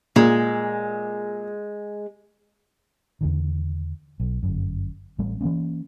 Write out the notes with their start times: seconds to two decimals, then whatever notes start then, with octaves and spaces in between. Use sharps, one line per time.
0.16 A#2 G#3
3.21 E2 D3 D#3
4.20 B1
4.43 G1 F#2
5.19 A1 G3 C4
5.41 E3 F#3 A#3 C#4